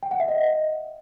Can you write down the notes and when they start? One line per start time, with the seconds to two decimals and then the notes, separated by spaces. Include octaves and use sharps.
0.03 G5
0.11 F#5
0.20 E5
0.28 D#5